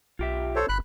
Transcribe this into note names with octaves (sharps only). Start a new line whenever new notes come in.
B1 F4 G4 E5
A4 C5 C#5
G1 B5 F#6